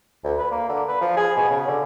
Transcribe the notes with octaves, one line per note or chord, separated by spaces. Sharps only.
D2
B4
A#3
D3
B4
F3
G#4
B2
C#3
D3